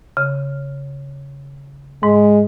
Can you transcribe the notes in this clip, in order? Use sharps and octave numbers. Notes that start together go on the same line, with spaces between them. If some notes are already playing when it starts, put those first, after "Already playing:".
C#3
G#2 G#3